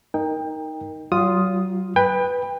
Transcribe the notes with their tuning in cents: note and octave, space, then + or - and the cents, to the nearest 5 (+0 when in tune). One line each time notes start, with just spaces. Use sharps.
D#4 +0 A#4 +0 G5 +25
F#3 +35 F4 +0 D#6 +0
B4 +0 G5 +30